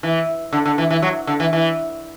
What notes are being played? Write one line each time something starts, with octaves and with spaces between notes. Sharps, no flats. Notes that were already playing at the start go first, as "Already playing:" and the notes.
E3
D3
D3
E3
E3
F#3
D3
E3
E3